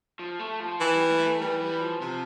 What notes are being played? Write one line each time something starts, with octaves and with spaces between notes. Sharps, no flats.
F3
A3
F3
E3
G3
A3
A3
E3 G3
G3
F3
C3 F3